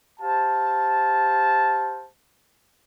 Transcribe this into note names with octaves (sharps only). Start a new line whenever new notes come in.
G4 C5 F5 A5